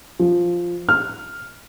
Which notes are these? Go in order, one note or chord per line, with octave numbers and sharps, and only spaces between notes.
F3
F6